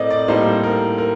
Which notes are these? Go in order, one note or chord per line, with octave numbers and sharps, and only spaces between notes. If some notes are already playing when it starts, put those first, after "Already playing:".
Already playing: A2 C4 A#4 D5 D#5
D5
A2 G3 A#3 D#4 C5
A#4
A#4